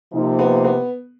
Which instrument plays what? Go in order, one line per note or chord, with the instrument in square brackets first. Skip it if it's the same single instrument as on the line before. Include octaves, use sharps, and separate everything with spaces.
[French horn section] C3 F3 A#3 D#4
[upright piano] B3
B3